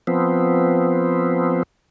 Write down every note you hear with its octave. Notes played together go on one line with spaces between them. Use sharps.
F3 B3 C4